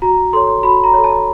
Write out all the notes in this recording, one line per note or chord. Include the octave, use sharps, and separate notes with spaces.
F#4 A#5
A4 C#5 C6
F#4 B5
A#5
A4 C#5
A5